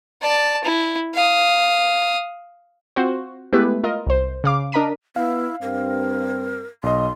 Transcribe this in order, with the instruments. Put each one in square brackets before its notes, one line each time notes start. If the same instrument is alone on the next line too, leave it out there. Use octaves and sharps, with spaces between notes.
[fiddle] D5 A5
E4
F5 D#6
[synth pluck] C4 F4 F#4 C5
G#3 A3 B3 E4 G4 B4
F4 A#4 D#5
C2 C5
C#3 F5 D6
D4 A#4 D#5 A#5 B6 D#7
[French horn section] B3 [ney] E4 [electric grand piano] F5
[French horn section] G2 C4 [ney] A#4
[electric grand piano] B1 D#5 [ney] C6